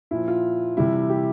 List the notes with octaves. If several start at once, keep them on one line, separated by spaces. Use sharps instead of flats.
A#2 F3 E4
F4
C3 E3 G3 E4
G4